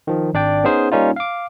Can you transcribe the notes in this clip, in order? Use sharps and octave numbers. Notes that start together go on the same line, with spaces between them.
D#3 F3
G#1 D4 D5 G5
B3 C#4 D#4 G#4 C5
G3 A#3 C#4 D#4 F4
F5 D6